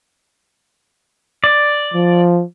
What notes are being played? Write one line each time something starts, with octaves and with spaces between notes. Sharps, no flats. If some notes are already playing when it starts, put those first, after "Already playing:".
D5
F3